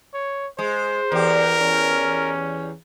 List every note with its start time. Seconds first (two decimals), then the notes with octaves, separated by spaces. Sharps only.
0.14 C#5
0.58 G#3 C5
1.12 E2 G4 A#4
1.61 C#4